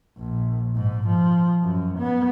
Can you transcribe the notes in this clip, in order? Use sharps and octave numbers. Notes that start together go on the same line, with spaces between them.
A#1
G#2
F3
F#2
B3